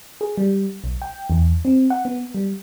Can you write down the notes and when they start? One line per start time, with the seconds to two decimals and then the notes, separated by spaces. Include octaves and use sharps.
0.21 G#4
0.38 G3
0.84 B1
1.02 G5
1.30 E2
1.65 C4
1.90 F#5
2.05 B3
2.34 G3